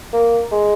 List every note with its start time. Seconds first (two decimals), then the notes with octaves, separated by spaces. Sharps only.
0.13 A#3
0.52 G#3